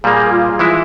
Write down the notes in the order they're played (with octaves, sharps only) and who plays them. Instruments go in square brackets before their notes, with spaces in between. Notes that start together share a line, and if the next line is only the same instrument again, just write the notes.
[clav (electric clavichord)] A#2 G3 A#3 [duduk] G#4
[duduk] F4
[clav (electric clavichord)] E3 G#3 E4